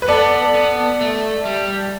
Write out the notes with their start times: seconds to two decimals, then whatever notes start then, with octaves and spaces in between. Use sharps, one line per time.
0.02 B4
0.08 B3 A4 D5
0.54 B3
1.01 A3
1.46 G3